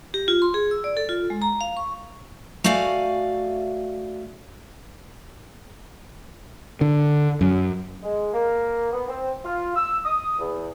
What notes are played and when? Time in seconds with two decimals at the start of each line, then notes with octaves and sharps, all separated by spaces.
0.14 G4
0.28 F4
0.42 C6
0.54 G#4
0.71 E6
0.84 D5
0.97 A4
1.09 F4
1.30 G#3
1.42 A#5
1.61 F5
1.77 C#6
2.64 A3 F#4 D5 F5 G#5
6.81 D3
7.41 F#2
8.03 G#3
8.33 A#3
8.92 B3
9.08 C4
9.44 F4
9.76 E6
10.04 D#6
10.39 E2